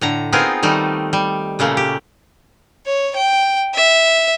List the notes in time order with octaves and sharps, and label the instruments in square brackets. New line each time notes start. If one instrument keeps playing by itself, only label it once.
[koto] A2 D3 A#5
B3 C4 D#4 F4 G#4 A#4
D#3 G3 A3 D#4
G3
A#2 C#3 A3 A#3
G4
[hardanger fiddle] C#5
G5
E5